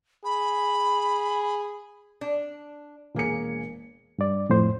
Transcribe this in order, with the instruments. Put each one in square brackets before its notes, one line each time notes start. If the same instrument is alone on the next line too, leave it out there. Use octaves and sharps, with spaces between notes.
[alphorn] G#4 [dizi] B5
[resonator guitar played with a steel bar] D4
[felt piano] E1 A#3 G#4 C#7
[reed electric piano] G2 D5
F2 A2 C5